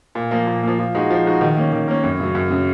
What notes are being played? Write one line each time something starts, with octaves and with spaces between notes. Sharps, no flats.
A#2
F3 A#3
A#2
F3 A#3
F3
G#3 D#4 F#4
F3
G#3 D#4 F#4
D#3
A#3 C#4
D#3
A#3 C#4
F#2
C#3 F#3
F#2
C#3 F#3